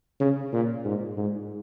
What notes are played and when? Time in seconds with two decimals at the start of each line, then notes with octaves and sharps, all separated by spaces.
0.20 C#3
0.53 A#2
0.85 G#2
1.17 G#2